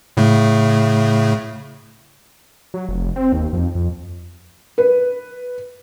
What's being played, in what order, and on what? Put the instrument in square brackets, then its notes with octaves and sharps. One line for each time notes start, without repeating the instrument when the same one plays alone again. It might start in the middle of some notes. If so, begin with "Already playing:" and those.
[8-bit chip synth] A2 C#3 A3
[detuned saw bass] F#3
F1
C4
D#2
F2
F2
[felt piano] B4